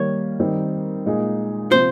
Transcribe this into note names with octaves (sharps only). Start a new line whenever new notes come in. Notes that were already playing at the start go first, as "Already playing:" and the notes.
Already playing: D#3 G3 A#3 C#5
D#3 G3 C4 D#4
A#2 G#3 D#4 G#4
C3 F3 C5